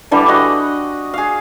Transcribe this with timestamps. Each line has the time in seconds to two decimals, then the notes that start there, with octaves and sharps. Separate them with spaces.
0.11 D3 E3 G3 D4
0.28 F#4 D#5 F#5
1.14 G#4 F5